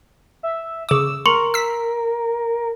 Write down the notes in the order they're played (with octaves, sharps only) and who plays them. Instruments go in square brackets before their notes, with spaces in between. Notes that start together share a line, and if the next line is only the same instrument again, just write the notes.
[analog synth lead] E5
[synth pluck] C#3 D6 [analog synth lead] E6
[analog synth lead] A#4 [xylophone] C6 C#6 C#7
[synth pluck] E6 B6